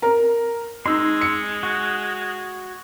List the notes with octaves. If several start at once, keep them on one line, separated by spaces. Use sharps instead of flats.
A#4 A#5
G#3 D#4 C6 E6
C#7
F#4